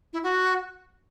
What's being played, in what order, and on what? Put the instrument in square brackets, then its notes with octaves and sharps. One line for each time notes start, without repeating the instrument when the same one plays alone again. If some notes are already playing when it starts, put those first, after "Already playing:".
[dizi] E4
F#4